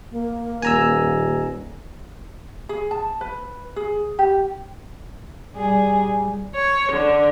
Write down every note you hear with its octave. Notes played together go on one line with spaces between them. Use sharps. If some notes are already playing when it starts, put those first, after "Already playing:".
A#3
D#1 G#5 A#5 E6
G#4
A5
B4
G#4
G4
G3 G#4
C#5
D3